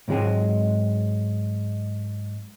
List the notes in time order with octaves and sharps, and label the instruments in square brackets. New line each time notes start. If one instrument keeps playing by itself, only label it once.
[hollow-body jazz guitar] G#2 C3 F#3 G#3 C4 G#5